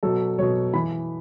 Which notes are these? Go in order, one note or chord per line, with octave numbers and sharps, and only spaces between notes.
B2 F#3 A4
B2 F#3 C#5
E3 B5